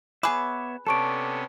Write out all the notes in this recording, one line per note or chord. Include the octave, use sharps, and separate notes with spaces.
B3 G#4 B4 C#5 E5 D6
C3 B3 C#4 A4 D5 A5 C#6 D7